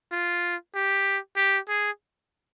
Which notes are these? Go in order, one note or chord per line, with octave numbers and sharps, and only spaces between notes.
F4
G4
G4
G#4